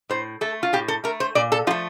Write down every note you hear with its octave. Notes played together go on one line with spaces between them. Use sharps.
A2 C5
A3 A4
F4
A2 G4
A4
A3 A#4
C5
A#2 D5
A4
F3 A3 F4